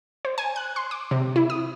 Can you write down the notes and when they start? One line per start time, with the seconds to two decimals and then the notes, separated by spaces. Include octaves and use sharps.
0.25 C5
0.38 G#5
0.56 F#6
0.76 C6
0.91 D6
1.11 C3
1.36 E4
1.50 D#6